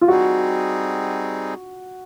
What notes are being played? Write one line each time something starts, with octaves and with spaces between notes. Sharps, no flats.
F4
G3 C4 D#4 F#4 G#4